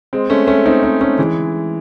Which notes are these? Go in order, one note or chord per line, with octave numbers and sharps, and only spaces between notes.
G#3 C4
A3 C#4
A3 C#4
C4 D#4
C4 D#4
A3 C#4
E3 G#3